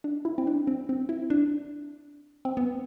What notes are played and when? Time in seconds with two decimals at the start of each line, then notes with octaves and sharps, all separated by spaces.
0.04 D4
0.25 E4
0.38 C4
0.47 D4
0.67 C4
0.89 C4
1.09 E4
1.30 D4
2.45 C4
2.57 B3